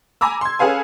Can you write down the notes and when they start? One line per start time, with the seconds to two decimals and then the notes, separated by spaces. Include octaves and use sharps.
0.21 G#5 A#5 B5 D6 E6
0.41 C6 G#6
0.59 C#4 G#4 A4 B4 F5 G#5